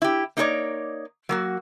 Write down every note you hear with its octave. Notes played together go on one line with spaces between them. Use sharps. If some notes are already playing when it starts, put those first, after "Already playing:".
E4 G4
A#3 D#4 G4 A#4 C#5 D5
F#3 A#3 F#4